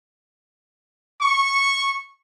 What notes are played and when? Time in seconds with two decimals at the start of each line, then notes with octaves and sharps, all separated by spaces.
1.22 C#6